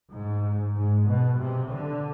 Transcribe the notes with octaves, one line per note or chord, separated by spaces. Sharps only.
G#2
G#2
B2
C3
D3